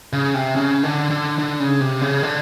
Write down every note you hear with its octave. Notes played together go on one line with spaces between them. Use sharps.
C#3
C3
C#3
D3
D3
D3
C#3
C3
C#3
D3